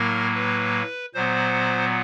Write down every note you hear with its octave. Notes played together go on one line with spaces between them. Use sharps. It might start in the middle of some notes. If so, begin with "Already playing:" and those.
Already playing: A2 F#3 A#3 A#4
B4
A#2 F#3 B3 C5